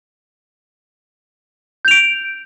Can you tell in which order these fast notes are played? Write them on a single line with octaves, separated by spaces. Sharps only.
G6 F7 D7